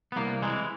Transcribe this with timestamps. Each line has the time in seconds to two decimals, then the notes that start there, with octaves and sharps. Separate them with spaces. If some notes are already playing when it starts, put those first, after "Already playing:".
0.12 B3
0.16 C2 A#3
0.42 E3 G#3